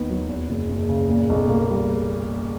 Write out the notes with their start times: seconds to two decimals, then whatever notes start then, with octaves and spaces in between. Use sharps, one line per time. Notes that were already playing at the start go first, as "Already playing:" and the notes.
Already playing: D#2 D#3 B3
0.10 F#3
0.29 E2
0.49 F#1
0.69 F#1
0.89 C#3
1.09 A#2
1.29 B1
1.49 A#3
1.70 G3